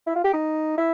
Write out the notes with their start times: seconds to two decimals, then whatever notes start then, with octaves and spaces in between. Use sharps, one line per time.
0.07 E4
0.15 F4
0.24 G4
0.33 D#4
0.78 E4